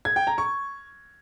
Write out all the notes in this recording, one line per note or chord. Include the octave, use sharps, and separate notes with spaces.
G#6
G5
A#5
C#6